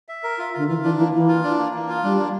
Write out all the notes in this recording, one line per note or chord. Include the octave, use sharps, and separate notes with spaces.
E5
A#4
F4
D3 F4
E3 F4
E3 D4
E3 A#3
E3 A#3
F4
D4
A#3
A#3
F4
G3 D4
A#3